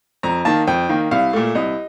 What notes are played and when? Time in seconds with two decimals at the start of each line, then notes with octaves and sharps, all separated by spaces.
0.23 F2 A#5
0.45 D#3 A#3 A5
0.67 F2 G5
0.89 D#3 A#3
1.11 C2 F5
1.33 A#2 A3
1.55 C2 D#5